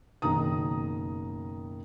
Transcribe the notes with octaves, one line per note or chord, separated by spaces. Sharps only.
F#1 B2 D#3 A#5 D#6